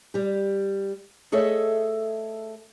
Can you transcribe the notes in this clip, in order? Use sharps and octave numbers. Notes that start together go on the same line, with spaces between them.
G3 G4
A3 G#4 A4 C#5 D#5 E5